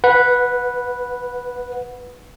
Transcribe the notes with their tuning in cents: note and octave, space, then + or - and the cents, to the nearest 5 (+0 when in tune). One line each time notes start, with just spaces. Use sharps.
B4 -5 F#5 -20